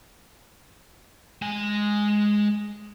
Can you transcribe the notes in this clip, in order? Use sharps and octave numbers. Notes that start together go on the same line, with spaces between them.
G#3 G#5